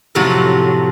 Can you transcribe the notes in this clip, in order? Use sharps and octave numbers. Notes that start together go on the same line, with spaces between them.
F2 A2 C3 F3 F#3